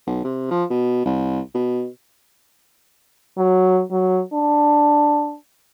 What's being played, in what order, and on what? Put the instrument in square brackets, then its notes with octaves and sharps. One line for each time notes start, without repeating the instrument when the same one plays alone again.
[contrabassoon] B1
C3
F3
B2
C2
B2
[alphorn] F#3
F#3
D4